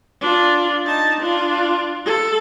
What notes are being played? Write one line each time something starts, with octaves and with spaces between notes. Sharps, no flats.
D4 F4
D#4 A5
D4 F4
A4